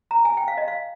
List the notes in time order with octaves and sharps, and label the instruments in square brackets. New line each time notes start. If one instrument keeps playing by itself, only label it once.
[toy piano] A#5
G#5
G5
F5
D#5
F5